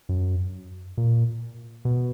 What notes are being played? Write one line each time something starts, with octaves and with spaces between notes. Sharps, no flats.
F#2
A#2
B2